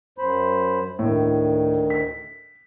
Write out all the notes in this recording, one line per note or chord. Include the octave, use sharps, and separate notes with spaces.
F#2 C5 B5
D2 A2 D#3
B6